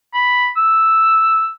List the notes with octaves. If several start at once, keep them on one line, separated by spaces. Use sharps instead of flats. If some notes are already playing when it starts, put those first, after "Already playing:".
B5
E6